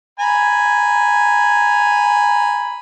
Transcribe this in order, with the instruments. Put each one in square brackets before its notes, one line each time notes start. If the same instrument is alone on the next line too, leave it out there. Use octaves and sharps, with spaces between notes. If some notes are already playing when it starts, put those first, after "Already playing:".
[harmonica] G#5 A#5 B5